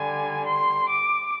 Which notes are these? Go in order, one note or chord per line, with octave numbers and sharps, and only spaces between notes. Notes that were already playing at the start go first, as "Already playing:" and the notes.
Already playing: D3 G3 G#5
C6
D6